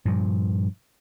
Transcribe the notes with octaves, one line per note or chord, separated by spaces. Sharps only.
G2 A#2 F3